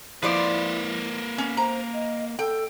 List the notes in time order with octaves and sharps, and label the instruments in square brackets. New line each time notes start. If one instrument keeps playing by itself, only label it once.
[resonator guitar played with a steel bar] F3 C5 D5 [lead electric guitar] A#3 B4 [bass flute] E4
[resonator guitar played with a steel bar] C#4
[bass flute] C5 [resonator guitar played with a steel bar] A#5
[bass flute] D#5
[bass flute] A4 [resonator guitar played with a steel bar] G5